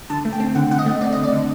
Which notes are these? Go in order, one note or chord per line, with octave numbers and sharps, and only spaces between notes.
D3 A5
A3
G5
C4
D3 F#5
D3 F#5
D#5
A3
C4 D5
D3 D#5
D5
D3